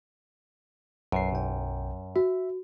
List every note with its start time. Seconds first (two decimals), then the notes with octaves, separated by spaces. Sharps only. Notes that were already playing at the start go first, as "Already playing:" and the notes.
1.12 B1 F#2 B4 C7
1.31 B1 G5
2.16 F#4 E5